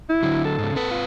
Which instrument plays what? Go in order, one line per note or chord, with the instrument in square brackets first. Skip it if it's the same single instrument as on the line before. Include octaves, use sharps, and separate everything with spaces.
[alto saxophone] E4
[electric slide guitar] D3 F#3
[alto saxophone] A4
[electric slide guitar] G#2 C#3
[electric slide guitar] G#2 C4 B4 [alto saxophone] A4
[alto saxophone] F4